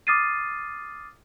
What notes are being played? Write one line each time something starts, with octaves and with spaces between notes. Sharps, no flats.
D6 D#6 F6 A6 C7 D#7